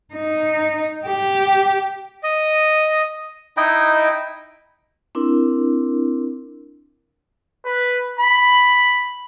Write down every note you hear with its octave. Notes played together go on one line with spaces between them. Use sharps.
D#4
G4
D#5
D#4 E4 D#5 G5
C4 D4 E4 A#4
B4
B5